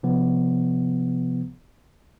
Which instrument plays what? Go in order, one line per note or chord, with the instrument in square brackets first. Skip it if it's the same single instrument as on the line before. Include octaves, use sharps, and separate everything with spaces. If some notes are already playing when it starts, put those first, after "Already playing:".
[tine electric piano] C3 F3 B3